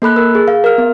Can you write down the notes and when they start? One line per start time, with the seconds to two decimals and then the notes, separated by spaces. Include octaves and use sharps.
0.02 A#3 A4 B5 F#6
0.16 A#4 E6
0.35 G#4
0.48 F5
0.64 A#4 F6
0.78 B3